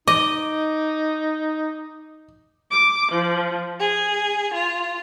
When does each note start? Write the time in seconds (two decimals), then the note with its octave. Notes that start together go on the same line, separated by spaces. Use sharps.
0.08 D#4 D#5 D6
2.72 D6
3.11 F3
3.80 G#4
4.53 F4